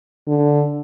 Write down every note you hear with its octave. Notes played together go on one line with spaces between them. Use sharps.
D3